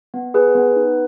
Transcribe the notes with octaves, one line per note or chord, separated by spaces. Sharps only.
B3
G#4 B4
B3
D#4